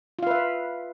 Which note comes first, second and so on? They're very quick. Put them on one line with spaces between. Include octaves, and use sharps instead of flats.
F4 F5 B4 E5